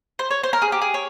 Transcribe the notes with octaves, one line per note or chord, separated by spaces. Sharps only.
C5
C#5
C5
A#4
G#4
G4
G#4
C#5